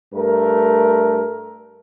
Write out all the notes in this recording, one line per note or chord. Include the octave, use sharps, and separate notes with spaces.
G2 A3 A#4